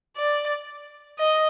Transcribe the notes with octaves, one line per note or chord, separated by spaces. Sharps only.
D5
D#5